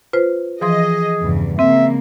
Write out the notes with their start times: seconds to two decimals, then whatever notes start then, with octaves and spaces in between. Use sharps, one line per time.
0.13 F4 B4 C5
0.61 E3 F3 G#4 D#5 C6
1.22 E2 G2 C#3
1.59 C#3 G#3 A#3 C4 E5